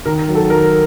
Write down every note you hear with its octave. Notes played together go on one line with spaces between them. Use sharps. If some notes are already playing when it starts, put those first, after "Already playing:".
D#3 A#4
F#3
A4
D#3 A#4